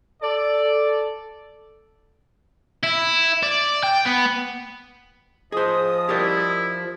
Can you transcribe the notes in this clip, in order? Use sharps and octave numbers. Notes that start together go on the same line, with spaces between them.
A4 D5
E4
D5
G5
B3
F3 G#4 C5 D#5 D#6
E4 G4 A#4 D5